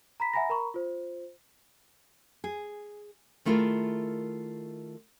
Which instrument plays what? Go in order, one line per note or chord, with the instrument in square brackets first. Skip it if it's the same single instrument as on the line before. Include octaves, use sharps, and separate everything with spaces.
[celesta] A#5 B5 B6
E5 F#5 G#5 A#5 B5 A#6
A#4 A#5 B5 C#6
F4 C5
[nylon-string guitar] G#4
D#3 A3 E4 F4 G#4 A#4